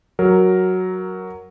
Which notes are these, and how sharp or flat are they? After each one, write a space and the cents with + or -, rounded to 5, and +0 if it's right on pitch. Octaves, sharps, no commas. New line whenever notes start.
F#3 +0 A#4 +0